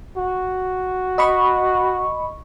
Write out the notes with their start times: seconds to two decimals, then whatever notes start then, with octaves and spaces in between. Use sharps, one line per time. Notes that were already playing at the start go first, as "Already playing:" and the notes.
0.17 F#4
1.18 D#5 B5 C#6